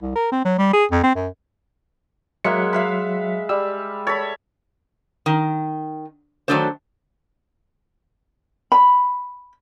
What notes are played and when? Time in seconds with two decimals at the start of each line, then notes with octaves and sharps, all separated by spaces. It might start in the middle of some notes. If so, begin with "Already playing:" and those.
0.02 C2
0.16 A#4
0.32 C4
0.45 F#3
0.58 G3
0.73 G#4
0.91 F2
1.03 C4
1.15 F#2
2.44 F#3 G#3 A#3 E5 F#5 C#7
2.73 E5 F5 B5
3.49 G3 E6
4.07 A4 C#5 B5
5.26 D#3
6.48 D#3 E3 F#3 A3 D4 C5
8.72 B5